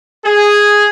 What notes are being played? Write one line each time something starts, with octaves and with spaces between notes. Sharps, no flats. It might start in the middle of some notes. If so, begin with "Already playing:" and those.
G#4